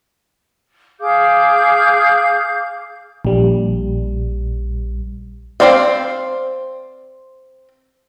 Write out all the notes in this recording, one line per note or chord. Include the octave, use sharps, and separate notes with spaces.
G#4 F5 D6 G6
A#1 G3
C4 F4 C5 D5 F5